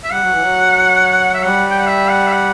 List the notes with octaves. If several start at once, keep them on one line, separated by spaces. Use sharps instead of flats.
E5
G3 F#5
F#3
E3
F#3
E5
G3 F#5
G5
F#5
E5
F#5
E5
F#5